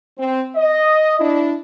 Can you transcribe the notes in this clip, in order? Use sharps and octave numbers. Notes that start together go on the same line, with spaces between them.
C4
D#5
D4 E4